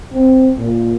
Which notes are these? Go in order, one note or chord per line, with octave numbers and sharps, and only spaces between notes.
C4
A#2